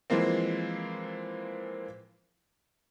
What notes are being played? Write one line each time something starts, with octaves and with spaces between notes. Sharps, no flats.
E3 F3 G#3 A#3 C4